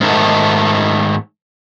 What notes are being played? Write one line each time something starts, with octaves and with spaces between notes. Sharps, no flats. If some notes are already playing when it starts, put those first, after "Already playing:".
G#2 D#3 A3